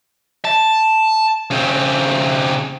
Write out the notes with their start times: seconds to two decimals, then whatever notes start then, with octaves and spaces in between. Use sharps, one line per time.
0.45 A5
1.51 C#3 C4